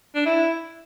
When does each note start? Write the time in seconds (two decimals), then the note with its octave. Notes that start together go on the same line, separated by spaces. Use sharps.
0.15 D4
0.26 E4